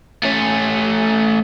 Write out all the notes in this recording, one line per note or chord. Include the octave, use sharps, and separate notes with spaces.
A3 C#4